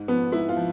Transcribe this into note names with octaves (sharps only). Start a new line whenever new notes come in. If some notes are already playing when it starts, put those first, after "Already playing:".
Already playing: G#2
F3 B3
G#2 E4
F4
F3